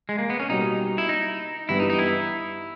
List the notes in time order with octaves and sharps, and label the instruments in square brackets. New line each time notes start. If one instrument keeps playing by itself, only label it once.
[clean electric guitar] G#3
A#3
B3
C#4
[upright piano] B2 G3 A#3 [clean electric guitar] D#4
[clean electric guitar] E4
D#4
[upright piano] G2 E3 G3 B3 [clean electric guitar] E4
[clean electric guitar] D#4
D#4
E4